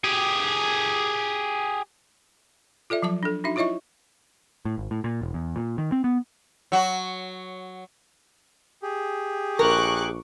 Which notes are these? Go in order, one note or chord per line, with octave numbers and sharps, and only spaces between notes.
G4 G#4
F4 A4 D5 E5
F3 F#3 A5 D6
D4 A4
D4 D#4 F#4 E5
E4 F4 C#5 D#5 E5 C#6
A2
G#1
A2
A#2
E1
E2
A#2
D#3
C4
B3
F#3 F#4
G4 G#4
A#1 A#4 C#6 D6 F#6